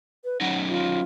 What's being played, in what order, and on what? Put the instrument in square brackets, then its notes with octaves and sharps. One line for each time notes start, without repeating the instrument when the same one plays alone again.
[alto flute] B4
[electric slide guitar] F#3 C#4 D#4 [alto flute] F#5
[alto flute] F4